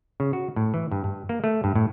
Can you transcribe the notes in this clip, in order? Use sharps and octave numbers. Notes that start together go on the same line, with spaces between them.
C#3
F#4
A2
E3
G2
G2
A#3
A3
G2
A2